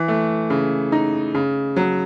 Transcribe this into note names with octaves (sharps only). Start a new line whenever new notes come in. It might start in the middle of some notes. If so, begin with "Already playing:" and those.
Already playing: E3
A3
C#3
D#4
C#3
F#3